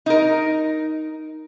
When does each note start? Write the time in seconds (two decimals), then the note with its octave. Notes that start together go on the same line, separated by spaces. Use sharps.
0.06 D#4 A#4